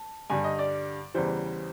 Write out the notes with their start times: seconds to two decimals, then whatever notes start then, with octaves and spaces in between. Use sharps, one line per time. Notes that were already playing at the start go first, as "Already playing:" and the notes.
Already playing: A5
0.30 G2 D3 G3 G#5
0.44 D#5
0.59 D5
1.14 E2 C#3 E3 G3 C5